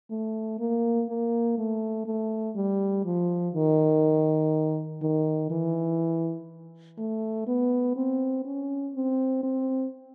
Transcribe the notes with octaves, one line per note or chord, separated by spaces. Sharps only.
A3
A#3
A#3
A3
A3
G3
F3
D#3
D#3
E3
A3
B3
C4
C#4
C4
C4